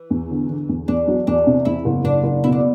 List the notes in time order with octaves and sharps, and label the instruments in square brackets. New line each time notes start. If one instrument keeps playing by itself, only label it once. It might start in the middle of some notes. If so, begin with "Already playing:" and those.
Already playing: [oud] E3
[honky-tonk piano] E2
D3
D3
E2
[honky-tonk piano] E2 [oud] D4
[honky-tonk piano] F#3
[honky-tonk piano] E2 [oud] D4
[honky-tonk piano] C3
[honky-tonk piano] E2 [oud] E4
[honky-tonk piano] F#1
[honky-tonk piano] F#1 [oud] D4
[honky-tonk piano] F#1
[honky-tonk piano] B2 [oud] E4
[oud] D4